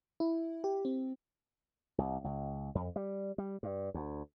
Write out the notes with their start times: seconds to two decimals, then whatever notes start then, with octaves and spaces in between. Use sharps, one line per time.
0.20 E4
0.64 G4
0.85 C4
1.98 C2
2.24 C#2
2.75 F2
2.96 G3
3.38 G3
3.63 G2
3.94 D2